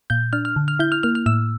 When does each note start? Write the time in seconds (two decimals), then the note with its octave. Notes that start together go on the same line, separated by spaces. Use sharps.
0.10 A#2 G6
0.33 D4 F6
0.45 F6
0.56 D3
0.68 F6
0.79 E4 G6
0.92 F6
1.03 A#3 F6
1.15 F6
1.26 A2 E6